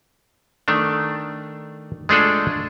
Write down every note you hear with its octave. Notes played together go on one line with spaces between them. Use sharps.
D#3 A3 D4
G#3 A3 D4 F4 G#4 A4